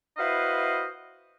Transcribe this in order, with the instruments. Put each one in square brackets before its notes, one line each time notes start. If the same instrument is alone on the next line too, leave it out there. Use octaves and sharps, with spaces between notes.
[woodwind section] E4 F#4 B4 C5 D#5 F5